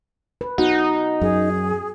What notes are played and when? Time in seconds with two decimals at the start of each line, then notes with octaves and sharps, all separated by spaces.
0.41 B4
0.58 B3 D#4 F#4 F#5
1.22 F#2 G#4